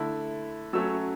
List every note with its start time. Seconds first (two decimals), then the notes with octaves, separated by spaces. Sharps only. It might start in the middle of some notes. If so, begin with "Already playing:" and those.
Already playing: D3 A3 E4
0.73 F#3 A3 C#4 E6